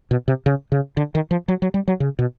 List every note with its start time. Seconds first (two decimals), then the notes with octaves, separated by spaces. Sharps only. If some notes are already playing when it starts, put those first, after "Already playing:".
0.11 B2
0.28 C3
0.46 C#3
0.72 C#3
0.97 D3
1.15 D#3
1.31 F3
1.48 F#3
1.62 F#3
1.74 G3
1.88 F#3
2.00 C#3
2.19 B2